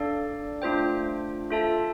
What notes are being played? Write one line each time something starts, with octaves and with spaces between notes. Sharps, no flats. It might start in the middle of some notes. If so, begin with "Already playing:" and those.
Already playing: D4 A4 D5 F5
A3 D4 F4 C5 G5
F4 A4 E5 A5